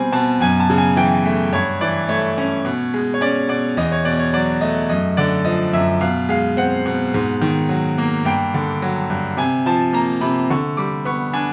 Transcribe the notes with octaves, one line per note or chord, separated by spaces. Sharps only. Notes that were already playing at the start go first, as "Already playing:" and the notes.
Already playing: B2 G3 C4 G#5
B2 A5
F#2 G#5
A5
C#3
G#5
E3 G5
A3
G2 C#5
E3 D5
A3 C#5
C#4
B2
G#3
C#5
C#4 D5
B2 D5
E2 D#5
C#5
B2 D5
C#5
F#3 D5
A3 D#5
F#2 D#5
D3 D5
F3 D#5
F#2 E5
B2 F5
G#3 F5
C4 F#5
B2
G#2
D#3
F#3
A#3
G2 G5
D3
F#3
G2
C3 G#5
F3 A5
A#3 A#5
C3 B5
D3 C#6
G3 D6
B3 C#6
D4 G#5